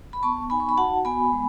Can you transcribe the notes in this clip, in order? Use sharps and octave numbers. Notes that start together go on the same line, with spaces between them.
B5
B3 A5 C#6
D#4 G#5 B5
C#6
B5
F#4 F#5 A5
B3 G#5 B5
G#3